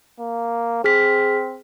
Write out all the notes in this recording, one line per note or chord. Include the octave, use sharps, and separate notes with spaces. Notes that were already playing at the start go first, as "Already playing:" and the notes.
A#3
C4 G#4 F6 B6